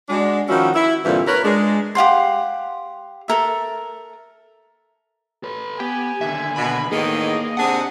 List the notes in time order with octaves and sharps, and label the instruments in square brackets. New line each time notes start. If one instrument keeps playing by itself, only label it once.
[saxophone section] G#3 D4 F#4
D#3 F3 C#4 E4 F#4
E4
G2 A#2 D3 E3 C4 F4
A#4 B4 C#5
G#3 D4
[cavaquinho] G4 F5 F#5 C6
A4 A#4 E5
[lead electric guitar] A4 B4
[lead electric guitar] B3 [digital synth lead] G4 [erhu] G#5
[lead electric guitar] D#2 D3 [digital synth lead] E5
[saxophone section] B2 [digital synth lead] B5
[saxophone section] E2 A2 D#3 [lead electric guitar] A#3 [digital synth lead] G#4 [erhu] D#5
[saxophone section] C3 D4 G#4 [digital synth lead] F#5